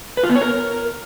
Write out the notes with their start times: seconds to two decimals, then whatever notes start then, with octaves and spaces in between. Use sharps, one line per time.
0.17 B4
0.23 F4
0.29 B3
0.35 C#5
0.42 A#4